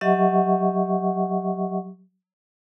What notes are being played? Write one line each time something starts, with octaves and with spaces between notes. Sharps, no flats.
F#3 G4 D#5 E5 F#5 C#6